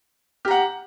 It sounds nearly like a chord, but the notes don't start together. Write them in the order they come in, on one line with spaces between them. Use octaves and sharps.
G4 A#5 F#5